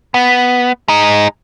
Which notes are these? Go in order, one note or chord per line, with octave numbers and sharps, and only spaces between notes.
B3
G#3 D#4